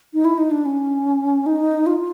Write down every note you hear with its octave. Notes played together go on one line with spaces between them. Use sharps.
D#4
E4
D#4
D4
C#4
D#4
F4